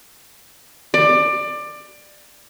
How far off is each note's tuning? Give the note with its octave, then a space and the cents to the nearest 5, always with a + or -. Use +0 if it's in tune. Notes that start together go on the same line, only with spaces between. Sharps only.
D5 +20